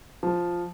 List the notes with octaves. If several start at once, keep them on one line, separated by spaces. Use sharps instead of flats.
F3